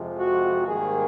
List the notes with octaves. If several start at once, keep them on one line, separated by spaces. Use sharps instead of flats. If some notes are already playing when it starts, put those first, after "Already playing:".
Already playing: F2 C3 F3 G#3
F#4
G#2 D#3 G3 A#3 G#4